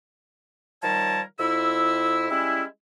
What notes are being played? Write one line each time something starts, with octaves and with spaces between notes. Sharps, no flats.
D#3 F3 G3 A#4 C#5 A5
F2 E4 E6
G3 G#3 C#4 E4